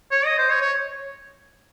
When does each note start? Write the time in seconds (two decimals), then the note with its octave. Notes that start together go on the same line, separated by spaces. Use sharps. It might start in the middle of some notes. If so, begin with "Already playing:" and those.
0.11 C#5
0.25 D#5
0.38 C5
0.50 C#5
0.61 C#5